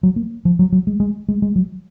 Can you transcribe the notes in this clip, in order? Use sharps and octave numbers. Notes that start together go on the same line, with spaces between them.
F#3
A#3
F3
F#3
F#3
G#3
G#3
G#3
G#3
F#3